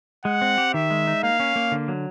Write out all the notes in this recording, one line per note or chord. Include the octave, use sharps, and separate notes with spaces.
G#3 F#5
C4
G4
D#3 E5
G#3
D#4
A#3 F5
C#4
A#3
D3
F#3